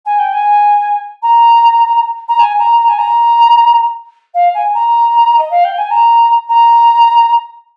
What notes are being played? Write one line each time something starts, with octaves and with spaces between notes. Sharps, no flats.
G#5
G5
G#5
A#5
A#5
G#5
A#5
A#5
G#5
A#5
F5
G#5
A#5
D#5
F5
G5
G#5
A#5
A#5